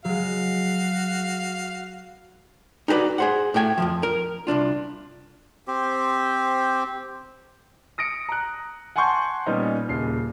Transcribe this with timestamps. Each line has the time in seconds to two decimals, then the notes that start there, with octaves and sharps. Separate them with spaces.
0.05 F#3 G#3 F#4 F5
2.88 D#4 F#4 G4 B4 D5
3.18 G#4 C5 F#5
3.54 A2 A3 G5 G#5
3.78 F2 C#3 F3
4.03 A#4
4.47 C2 F#2 D4 F4
5.68 C4 G4 C5
7.98 D#6 A#6 C#7 D7
8.29 A#5 F#6
8.96 F#5 G#5 A5 C6 C#6 G6
9.46 A#2 G3 B3 C#4 D#4
9.88 D#1 A#2 C#3 C7